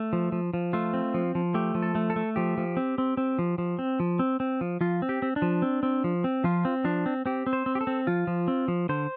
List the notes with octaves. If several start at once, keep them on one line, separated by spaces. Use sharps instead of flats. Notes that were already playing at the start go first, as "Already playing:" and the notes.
Already playing: A3
F3
F3
F3
A3 F4
C4
F3
F3
A3 G4
F3
A4
A3
A4
A3
F3 G4
F3
C4
C4
C4
F3
F3
C4
F3
C4
C4
F3
F3 F4
C4
G4
C4
D4
F3
C4
C4
F3
C4
F3 F4
C4
F3 D4
C4
C4 G4
C4
C5
C4
G4
A4
C4
F3 F4
F3
C4
F3
D3 C5